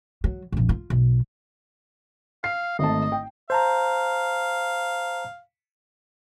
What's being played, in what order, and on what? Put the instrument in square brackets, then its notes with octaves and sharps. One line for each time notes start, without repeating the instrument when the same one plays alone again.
[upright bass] F#3
A#1 F2
F4
B1
[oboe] F5 [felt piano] C7
[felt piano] G#1 A3 A5 [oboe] D#5
[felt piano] G5
[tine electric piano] C5 A5 A#5 [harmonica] F5